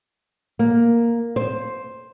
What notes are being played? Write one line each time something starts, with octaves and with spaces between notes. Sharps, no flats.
A#3
C5